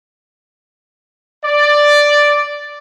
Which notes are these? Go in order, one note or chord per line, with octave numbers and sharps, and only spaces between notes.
D5